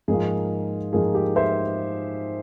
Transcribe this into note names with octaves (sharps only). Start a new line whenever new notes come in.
G#2 F3 A#3 F4 G#4
G#2 F3 A#3 F4 G#4
G4
C5 E5